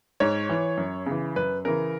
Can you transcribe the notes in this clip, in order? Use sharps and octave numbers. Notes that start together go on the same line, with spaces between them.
G#2 C#5
E3
F#2
C#3 E3
F#2 B4
C#3 E3 A#4